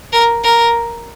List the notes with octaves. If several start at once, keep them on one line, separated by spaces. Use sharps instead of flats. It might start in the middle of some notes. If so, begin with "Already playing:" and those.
A#4
A#4